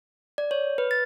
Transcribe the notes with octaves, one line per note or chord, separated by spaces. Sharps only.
D5
C#5
B4
A6